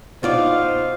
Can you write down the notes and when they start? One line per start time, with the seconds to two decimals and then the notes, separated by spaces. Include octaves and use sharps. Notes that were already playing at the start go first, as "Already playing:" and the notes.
0.23 B2 D#4 F4 C5 D5 F5